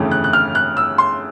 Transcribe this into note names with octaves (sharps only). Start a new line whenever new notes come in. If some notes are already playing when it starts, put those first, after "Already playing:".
Already playing: G1 F2 C#3 E3 A3
F#6
F#6
F6
F#6
E6
C6